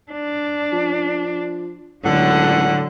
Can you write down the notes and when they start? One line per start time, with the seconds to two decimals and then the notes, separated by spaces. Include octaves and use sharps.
0.12 D4
0.73 F3
2.05 C#2 A2 D3 F#3 A4 F#5